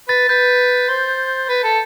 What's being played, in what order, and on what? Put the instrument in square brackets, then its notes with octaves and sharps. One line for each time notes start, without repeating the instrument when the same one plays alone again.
[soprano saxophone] B4 [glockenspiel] A6
[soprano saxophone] B4 [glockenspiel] G6
[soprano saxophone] C5
B4
A4